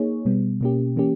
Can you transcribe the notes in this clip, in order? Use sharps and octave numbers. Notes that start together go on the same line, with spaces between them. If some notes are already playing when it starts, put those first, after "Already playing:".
Already playing: A#3 D#4 G#4 C#5
B2 G3 B3
B2 A#3 C#4 G4
E3 A#3 C#4 G4